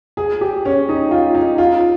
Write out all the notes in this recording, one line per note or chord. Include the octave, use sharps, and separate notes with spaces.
G#4
G4
C#4
D#4
F4
D#4
F4